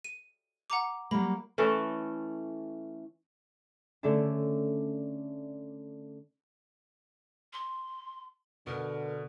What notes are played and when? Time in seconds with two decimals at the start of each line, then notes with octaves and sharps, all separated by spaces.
0.04 D#7
0.70 F#5 A#5 D6
1.11 F#3 G3 A#3 B5
1.58 E3 A3 C#4 A4
4.03 D3 A3 C#4 D4
7.53 C6
8.67 B2 D3 A#4